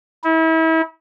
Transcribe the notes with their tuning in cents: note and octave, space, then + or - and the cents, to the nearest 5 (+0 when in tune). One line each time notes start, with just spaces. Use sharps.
E4 -35